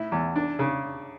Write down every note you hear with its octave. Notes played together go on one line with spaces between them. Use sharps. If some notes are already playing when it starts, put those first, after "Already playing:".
Already playing: A2 E4
E2
D4
C#3